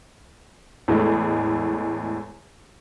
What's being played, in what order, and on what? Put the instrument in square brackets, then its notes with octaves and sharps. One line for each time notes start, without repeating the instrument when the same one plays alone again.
[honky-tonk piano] E2 A2 G#3 A3